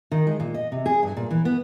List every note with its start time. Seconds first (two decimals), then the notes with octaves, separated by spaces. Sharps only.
0.11 D#3
0.27 G#3
0.40 A#2
0.54 D#5
0.72 C3
0.86 G#4
1.03 G2
1.17 A#2
1.31 E3
1.45 B3